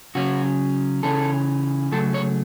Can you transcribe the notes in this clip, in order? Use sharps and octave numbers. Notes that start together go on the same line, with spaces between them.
C#3 F#3 C#4 F#4
C#3 E3 C#4 A4
C#3 F#3 A3 A4
C#5